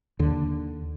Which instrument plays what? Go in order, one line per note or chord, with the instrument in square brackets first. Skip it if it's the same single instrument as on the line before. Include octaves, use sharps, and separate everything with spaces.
[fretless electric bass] D#2 D3